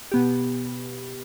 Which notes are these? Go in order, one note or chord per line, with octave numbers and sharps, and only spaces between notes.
B2 B3 G4